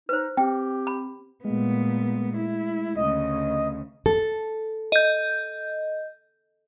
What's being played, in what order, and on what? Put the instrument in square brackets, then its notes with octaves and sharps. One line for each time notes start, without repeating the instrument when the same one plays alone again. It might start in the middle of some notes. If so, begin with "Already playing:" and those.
[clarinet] D#4 [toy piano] B4 C5
[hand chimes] C4 [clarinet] G4 [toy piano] G5
[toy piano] B5
[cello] A#2 B3 [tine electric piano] G#3 A3
[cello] E4
[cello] D2 C#3 [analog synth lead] D#5
[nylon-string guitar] A4
[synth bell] D#5 G6